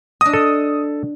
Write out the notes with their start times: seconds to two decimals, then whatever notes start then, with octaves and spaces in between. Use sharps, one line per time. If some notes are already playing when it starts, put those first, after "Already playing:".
0.21 D4 D#5 D#6
0.33 A4